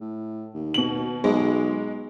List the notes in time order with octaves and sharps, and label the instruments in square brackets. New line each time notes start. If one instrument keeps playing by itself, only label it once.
[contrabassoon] A2
D#2
[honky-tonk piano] B2 F#7
[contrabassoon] B1 [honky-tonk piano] G#3